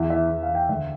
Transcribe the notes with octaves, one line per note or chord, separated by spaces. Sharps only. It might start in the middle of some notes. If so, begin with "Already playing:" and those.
Already playing: E2 E5
E3 E5
E2
F5
E3
G5
D2 E5